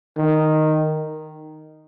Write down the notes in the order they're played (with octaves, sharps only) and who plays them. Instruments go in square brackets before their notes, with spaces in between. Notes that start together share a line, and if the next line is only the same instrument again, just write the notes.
[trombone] D#3